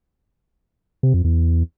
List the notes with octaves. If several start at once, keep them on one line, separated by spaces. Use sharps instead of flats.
C3
F2
E2